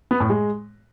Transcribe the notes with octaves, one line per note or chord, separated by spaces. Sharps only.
B3
A2
G#3